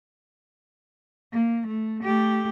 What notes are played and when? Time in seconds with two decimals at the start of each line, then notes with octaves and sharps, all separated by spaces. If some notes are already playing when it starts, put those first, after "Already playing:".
1.33 A#3
1.67 A3
2.03 A3 G4